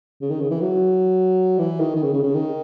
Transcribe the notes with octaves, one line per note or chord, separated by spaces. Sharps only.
C#3
D#3
C#3
E3
F#3
E3
D#3
D#3
C#3
C#3
C#3
D#3